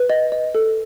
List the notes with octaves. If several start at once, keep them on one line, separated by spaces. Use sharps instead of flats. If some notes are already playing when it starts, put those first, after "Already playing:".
Already playing: B4
D#5
D#5
A4